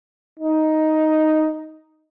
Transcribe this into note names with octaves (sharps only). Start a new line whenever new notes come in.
D#4